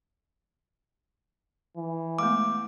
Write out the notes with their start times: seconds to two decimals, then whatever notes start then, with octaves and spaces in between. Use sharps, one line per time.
1.77 E3
2.19 G#3 A3 B3 D6